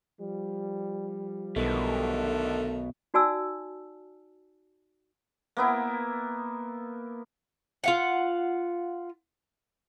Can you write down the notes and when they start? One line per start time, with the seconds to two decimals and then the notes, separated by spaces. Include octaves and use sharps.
0.20 F3 G3
1.56 B1 B2 D3 D#3 A3
3.14 D#4 F#4 D5 G#5 A5 E6
5.57 A#3 B3 E4
7.84 F4 F5 F#5